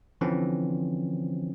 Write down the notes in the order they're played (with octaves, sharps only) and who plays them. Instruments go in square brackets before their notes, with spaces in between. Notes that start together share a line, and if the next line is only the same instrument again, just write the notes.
[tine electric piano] D3 E3 F3 C4 C#4